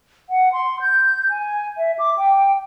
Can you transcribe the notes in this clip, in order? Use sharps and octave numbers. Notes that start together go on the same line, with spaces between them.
F#5
C6
G6
G#5
E5
D6
G5